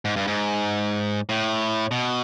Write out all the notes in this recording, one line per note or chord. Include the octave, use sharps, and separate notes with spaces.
G#2
G2
G#2
A2
B2